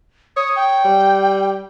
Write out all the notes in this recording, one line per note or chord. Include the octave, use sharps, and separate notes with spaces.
C#5 D#6
G5
G3